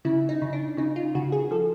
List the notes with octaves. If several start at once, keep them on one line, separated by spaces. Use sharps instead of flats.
C#3 E4
D#4
C#3
D4
C#3 D#4
F4
C#3 F#4
G#4
F3 A4